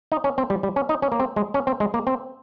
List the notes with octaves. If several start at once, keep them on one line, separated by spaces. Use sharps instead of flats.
D#4
C#4
C4
G3
G3
C#4
D#4
C#4
A#3
C4
G#3
C#4
C4
G#3
A#3
C4